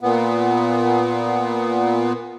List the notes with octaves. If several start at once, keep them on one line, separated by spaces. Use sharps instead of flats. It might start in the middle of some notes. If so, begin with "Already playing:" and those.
A#2 B3